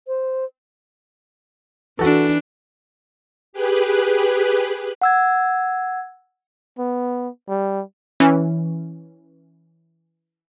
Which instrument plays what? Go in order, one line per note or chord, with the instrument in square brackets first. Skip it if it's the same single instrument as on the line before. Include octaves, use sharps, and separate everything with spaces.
[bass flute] C5
[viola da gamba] E3 D4 [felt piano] F#4 A4
[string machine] G4 G#4 B4 F#6
[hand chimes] F#5 E6 G#6
[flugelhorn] B3
G3
[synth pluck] E3 C#4